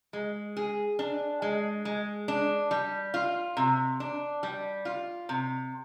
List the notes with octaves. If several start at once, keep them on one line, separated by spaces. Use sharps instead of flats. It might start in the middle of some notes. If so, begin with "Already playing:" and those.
G#3
G#4
D4
G#3
G#3
D4
G3
F4
C3
D4
G3
F4
C3